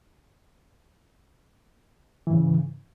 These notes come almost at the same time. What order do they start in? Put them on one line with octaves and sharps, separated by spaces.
E3 G#2 C#3